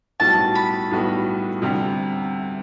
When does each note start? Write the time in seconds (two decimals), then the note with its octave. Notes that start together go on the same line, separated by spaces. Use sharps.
0.20 B1 A2 G3 B3 F#4 A5
0.55 B5
0.91 B1 A2 G3 B3 F#4
1.62 D2 C3 G3